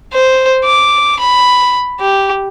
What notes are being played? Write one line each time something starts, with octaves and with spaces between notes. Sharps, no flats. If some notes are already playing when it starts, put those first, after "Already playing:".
C5
D6
B5
G4